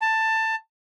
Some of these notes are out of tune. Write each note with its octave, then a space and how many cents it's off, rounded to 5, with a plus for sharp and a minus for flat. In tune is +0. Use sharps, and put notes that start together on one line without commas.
A5 +15